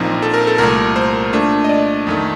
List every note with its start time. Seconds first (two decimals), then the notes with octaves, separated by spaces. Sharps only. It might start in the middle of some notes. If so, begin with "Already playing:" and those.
Already playing: A#1 A#2 F3 C4 D#4
0.22 A4
0.34 A#4
0.47 A4
0.58 C2 A#2 A3 A#4
0.96 C5
1.33 A#2 A3 D4
1.64 D#5
1.69 D5
2.07 F2 D#3 A3